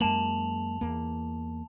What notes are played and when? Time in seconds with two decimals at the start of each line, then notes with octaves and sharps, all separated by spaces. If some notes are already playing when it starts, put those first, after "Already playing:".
0.01 F#2 G#3 A#3 A5 F7 F#7
0.81 E2 A#3